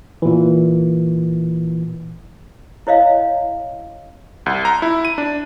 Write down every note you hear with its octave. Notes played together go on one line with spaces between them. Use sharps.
A#2 E3
E4 C#5 D#5 F5
C2
A#5
E4
D#7
D4